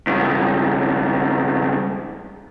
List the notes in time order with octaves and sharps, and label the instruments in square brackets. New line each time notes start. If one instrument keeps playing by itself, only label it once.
[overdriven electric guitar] C#2 G2